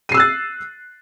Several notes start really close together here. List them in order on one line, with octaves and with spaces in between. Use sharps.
D#7 C7 E6 F#6 A6